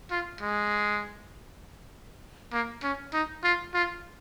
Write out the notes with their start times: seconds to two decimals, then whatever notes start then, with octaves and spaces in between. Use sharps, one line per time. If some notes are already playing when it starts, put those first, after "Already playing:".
0.11 F4
0.41 G#3
2.53 A#3
2.83 C#4
3.13 D#4
3.44 F4
3.74 F4